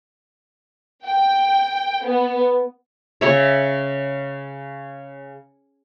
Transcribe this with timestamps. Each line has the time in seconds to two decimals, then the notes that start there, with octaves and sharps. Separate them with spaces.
1.04 G5
2.05 B3
3.21 C#3 C#5 E5